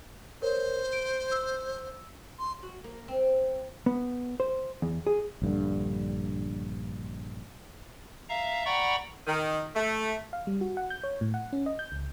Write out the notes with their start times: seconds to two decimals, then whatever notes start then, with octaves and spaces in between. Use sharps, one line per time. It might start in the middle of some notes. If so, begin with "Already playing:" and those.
0.42 A#4 C5 C#5
0.93 D7
1.32 E6
2.39 C6
2.63 F#4
2.84 A#3
3.08 C4
3.86 B3
4.40 C5
4.82 E2
5.07 G#4
5.42 A#1 G2 D3
8.29 E5 F5 A#5
8.66 D5 F#5 G5 A#5 B5 C#6
9.27 D#3
9.76 A3
10.33 F5
10.47 G3
10.61 F#4
10.77 F#5
10.90 G6
11.04 C#5
11.21 A2
11.34 F#5
11.53 C#4
11.66 D#5
11.79 G6
11.92 C#2